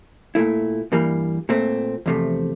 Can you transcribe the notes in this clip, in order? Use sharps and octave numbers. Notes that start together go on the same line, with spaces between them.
A#2 A3 E4
G2 E3 G3 A#3
A#2 A3 C4
E2 C3 F3 A3